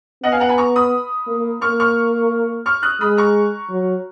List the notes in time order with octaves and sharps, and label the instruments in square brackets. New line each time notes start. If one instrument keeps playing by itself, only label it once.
[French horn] B3 [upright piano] D#5 F#5
[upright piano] F5 G#5
F#5 A#5
G#5 B5
A#5 C#6
B5 D#6
[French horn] A#3
[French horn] A#3 [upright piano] C#6 F6
[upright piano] C#6 F6
C#6 F6
D#6 F#6
[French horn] G#3 [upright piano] B5 D#6
[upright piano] A#5 C#6
[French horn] F#3